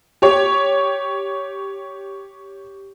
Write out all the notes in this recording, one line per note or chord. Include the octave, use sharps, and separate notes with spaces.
G4 C#5